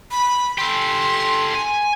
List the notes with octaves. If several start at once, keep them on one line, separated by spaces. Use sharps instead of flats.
B5
G4 A4 C6
G#5